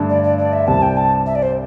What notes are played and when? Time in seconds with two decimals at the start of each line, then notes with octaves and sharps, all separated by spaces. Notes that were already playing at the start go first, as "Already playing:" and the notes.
Already playing: G2 D3 A3 D4 A4
0.10 D5
0.23 D5
0.38 D5
0.53 E5
0.67 C2 C3 G3 C4 A5
0.82 G5
0.97 A5
1.26 E5
1.35 D5
1.43 C5